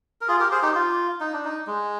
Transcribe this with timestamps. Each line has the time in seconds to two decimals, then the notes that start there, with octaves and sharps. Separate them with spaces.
0.21 A#4
0.28 F4 G#4
0.40 G4 A#4
0.51 G#4 C5
0.62 D#4 G4
0.75 F4
1.20 D#4
1.33 D4
1.45 D#4
1.67 G#3